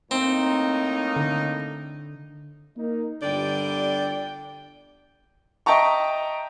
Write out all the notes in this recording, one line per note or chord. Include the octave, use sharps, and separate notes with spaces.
A2 A#3 C4 D#4
D3
A#3 D#4
G1 D3 G3 D5 G5
D#5 E5 G5 A5 A#5 C#6